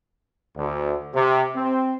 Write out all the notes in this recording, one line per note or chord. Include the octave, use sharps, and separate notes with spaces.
D2
C3
C4